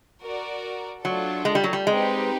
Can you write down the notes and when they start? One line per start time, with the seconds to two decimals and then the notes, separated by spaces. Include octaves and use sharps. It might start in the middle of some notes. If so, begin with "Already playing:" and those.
0.22 F#4 A#4 D5
1.05 F#3 A3 D4 F4 A4
1.45 G#3
1.55 G3
1.64 F#3
1.73 G3
1.87 G#3 C4 D#4 G4 B4